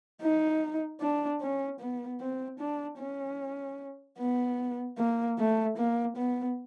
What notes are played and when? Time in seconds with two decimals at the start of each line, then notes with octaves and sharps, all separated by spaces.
0.22 D#4
1.01 D4
1.41 C#4
1.80 B3
2.20 C4
2.60 D4
2.99 C#4
4.19 B3
4.98 A#3
5.38 A3
5.77 A#3
6.17 B3